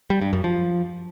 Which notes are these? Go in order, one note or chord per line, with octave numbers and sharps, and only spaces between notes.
G3
G2
F#2
F3